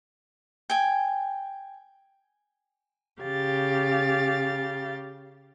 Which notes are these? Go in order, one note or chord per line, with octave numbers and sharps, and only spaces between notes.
G5 G#5
C#3 G4 F5 A6